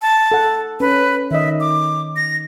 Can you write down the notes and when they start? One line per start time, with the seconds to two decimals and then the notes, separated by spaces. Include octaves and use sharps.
0.02 A5
0.32 A4 F#5
0.80 C#4 B4
1.31 D#3 D#5 E5
1.60 D6
2.16 A#6